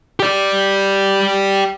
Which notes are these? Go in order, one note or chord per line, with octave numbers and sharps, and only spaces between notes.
G4 D5